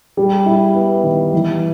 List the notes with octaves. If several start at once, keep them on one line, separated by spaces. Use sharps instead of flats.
G3
E4
B3
D#3
E3